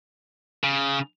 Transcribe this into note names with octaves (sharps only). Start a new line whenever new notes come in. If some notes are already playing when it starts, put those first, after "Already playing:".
C#3